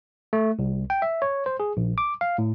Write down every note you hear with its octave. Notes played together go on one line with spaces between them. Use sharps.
A3
C2
G5
E5
C#5
C5
G#4
A#1
D6
F5
A2